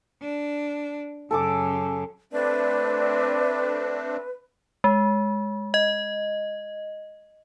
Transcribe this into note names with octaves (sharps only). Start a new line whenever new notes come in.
D4
F#2 C#3 A4 G#5 D6
A3 C4 D4 B4 D5
G#3
D#5